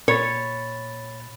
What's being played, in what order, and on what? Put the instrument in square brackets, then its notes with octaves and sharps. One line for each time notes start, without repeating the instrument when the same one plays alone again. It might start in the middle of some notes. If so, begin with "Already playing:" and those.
[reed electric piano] A#2 B5 A6 [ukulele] C#5